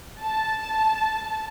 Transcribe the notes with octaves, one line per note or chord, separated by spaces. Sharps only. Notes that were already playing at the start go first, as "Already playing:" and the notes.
A5